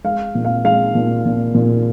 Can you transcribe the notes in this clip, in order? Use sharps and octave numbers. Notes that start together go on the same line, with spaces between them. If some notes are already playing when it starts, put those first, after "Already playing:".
G#3 F5
A#2
F5
G#3 F5
A#2
A#2
A#2